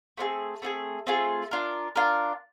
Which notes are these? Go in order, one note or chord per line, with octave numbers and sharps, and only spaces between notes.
A3 C4 F4 G#4
A3 C4 F4 G#4
A3 C4 F4 G#4
D4 F4 A#4
D4 F4 A#4